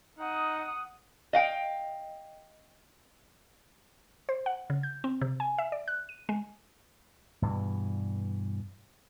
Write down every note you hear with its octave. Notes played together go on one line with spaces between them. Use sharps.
D#4 F#5 D#6
D#5 F5 G5
C5
F#5
C#3
G6
C4
C3
G#5
E5
D5
F#6
D#7
G#3
G2 B2 E3